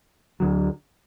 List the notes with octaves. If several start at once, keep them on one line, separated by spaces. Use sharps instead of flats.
D2 D3 F#3